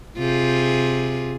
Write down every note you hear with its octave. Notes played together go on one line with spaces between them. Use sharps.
C3 F4 G#4